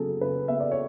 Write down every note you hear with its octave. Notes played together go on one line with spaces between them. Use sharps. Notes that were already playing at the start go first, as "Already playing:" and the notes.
Already playing: C#3 F#3 B3 G#4 A4
C#3 B4
B3 E5
D5
C#5